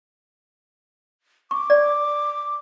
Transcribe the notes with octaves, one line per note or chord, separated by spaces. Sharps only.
C#6 D6
D5